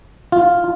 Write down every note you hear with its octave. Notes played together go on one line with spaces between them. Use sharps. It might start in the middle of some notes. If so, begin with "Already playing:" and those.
F4